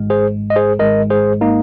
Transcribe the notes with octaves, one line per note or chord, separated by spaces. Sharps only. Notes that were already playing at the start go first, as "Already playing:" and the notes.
Already playing: G#1 G#2 G#3
G#4 C5
D#5
G#4 C5
G#1 G#2 G#3 A#4 D#5
G#4 C5
A#3 D#4